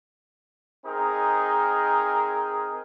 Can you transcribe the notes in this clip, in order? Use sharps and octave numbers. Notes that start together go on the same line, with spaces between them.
C4 D#4 G#4 A#4